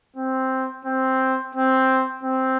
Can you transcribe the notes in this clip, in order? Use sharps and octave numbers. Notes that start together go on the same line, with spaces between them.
C4
C4
C4
C4